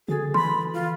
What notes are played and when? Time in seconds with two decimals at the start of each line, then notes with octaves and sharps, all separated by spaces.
0.08 D3 F#4 G#4 A4
0.34 E3 B5 C6
0.74 F4